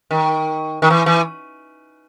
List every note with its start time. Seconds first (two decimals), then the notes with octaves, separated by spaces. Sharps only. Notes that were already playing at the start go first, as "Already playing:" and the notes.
0.11 D#3
0.82 D#3
0.90 E3
1.06 E3